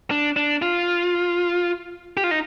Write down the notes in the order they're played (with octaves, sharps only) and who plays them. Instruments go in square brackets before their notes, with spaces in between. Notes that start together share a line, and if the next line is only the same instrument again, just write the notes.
[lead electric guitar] D4
D4
F4
G4
F4
D#4